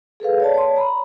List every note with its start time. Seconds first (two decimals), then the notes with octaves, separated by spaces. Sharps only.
0.20 G#4 A4 B4 F5
0.40 C#5 D5 A5
0.54 C#5 A5 C6
0.76 A#5 B5